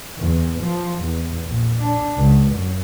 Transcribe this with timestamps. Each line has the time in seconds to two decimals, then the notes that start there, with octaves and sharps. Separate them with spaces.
0.18 E2
0.60 F3
1.00 E2
1.45 A#1
1.81 D4
2.16 C#2
2.52 F#2